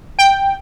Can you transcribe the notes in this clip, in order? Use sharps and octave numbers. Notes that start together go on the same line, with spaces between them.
G5